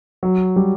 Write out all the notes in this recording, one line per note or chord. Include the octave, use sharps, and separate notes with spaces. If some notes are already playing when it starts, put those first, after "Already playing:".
F#3
G3